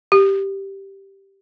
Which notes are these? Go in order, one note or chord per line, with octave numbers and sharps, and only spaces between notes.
G4